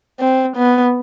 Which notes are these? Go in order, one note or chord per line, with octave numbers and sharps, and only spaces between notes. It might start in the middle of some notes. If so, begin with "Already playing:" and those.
C4
B3